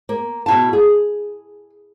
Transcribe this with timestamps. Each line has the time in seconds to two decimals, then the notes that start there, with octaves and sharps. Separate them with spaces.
0.09 A#3
0.46 B2 E4 A5
0.73 G#4